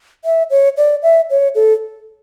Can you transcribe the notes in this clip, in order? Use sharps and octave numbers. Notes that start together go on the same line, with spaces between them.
E5
C#5
D5
E5
C#5
A4